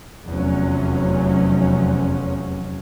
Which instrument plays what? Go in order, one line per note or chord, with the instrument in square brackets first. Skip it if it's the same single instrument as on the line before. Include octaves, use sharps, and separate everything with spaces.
[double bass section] F1 E2 F3 F#3 C#4